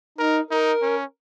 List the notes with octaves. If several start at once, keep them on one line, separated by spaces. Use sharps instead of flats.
D#4 A#4
D#4 A#4
C#4